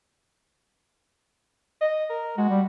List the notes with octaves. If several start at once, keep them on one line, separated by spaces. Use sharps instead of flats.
D#5
A#4
G#3 F#4
G3